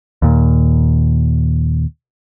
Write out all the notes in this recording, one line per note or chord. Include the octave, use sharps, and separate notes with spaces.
D#2 A#2